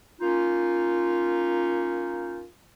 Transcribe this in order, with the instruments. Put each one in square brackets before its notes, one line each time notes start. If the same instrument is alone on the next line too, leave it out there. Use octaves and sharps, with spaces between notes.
[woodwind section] A#3 C#4 D#4 F4